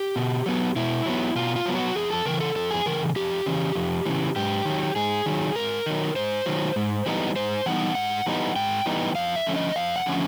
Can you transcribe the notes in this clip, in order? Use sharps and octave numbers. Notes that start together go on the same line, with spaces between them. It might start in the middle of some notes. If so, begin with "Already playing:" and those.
Already playing: G4
B2
F#3 B3
B2 E4
F#3 B3
B2 F4
F4
F#3 B3
F#4
F2 G#4
A4
C#3 E3 A#4
A4
F2 A4
G#4
C#3 E3 A#4
F2 G4
C#3 E3
F2
C#3 E3
G#2 G4
D#3 F#3
G#2 G#4
D#3 F#3
G#2 A#4
D#3 F#3
G#2 C5
D#3 F#3
G#2
E3 G3 B3 D#4
G#2 C5
E3 G3 B3 D#4 F#5
G#2 F#5
E3 G3 B3 D#4
G#2 G5
E3 G3 B3 D#4
F2 F5
E5
D3 F3 A3 C#4
D#5
F2 F5
F#5
D3 F3 A3 C#4